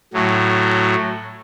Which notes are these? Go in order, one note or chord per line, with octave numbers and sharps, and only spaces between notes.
A2 F#3